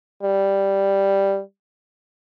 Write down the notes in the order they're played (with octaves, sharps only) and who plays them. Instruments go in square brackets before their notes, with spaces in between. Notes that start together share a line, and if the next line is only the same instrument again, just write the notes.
[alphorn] G3